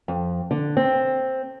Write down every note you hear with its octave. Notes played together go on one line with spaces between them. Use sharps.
F2
D3
C4